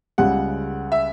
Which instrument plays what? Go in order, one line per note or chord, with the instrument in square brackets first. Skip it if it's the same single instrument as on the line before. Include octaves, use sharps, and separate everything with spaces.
[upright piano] C#2 C#3 G3 [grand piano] F#5
[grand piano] E5